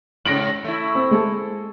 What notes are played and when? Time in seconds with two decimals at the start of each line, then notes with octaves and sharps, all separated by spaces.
0.25 G#2 C#3 A#6 D7 F#7
0.64 A3 E4
0.95 C4
1.11 G#3 A4